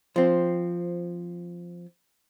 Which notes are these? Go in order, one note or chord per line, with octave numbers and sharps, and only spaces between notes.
F3 C4